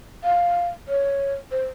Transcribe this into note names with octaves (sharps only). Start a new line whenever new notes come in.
F5
C#5
C5